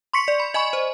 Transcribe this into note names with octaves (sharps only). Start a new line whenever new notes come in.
C6 C#6 B6 C#7
D5
B5
D#5 G#5 B5 C#6
C5